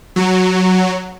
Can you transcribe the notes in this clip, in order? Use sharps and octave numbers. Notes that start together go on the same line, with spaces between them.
F#3